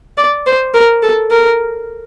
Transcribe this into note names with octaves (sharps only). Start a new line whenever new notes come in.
D5
C5
A#4
A4
A#4